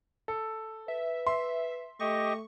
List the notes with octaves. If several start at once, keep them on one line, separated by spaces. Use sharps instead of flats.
A4
B4 E5
E5 C6
A3 G4 D#5 C#6